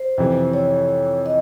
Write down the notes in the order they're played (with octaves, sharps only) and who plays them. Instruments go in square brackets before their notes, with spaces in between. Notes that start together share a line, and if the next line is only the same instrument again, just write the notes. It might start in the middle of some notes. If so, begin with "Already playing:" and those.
Already playing: [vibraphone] C5
[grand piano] F2 C3 E3
[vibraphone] C#5
D#5